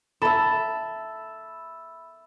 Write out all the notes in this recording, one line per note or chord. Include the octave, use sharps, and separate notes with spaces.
A4 E5 B5